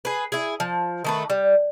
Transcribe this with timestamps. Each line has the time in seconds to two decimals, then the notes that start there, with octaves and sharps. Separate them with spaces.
0.05 G#4 B4
0.32 E4 G#4
0.60 F3
1.04 D#3 A3 B4
1.30 G3